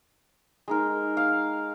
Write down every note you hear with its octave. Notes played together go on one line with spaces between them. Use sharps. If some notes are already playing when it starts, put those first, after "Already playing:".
G#3 D#4 A#4
F5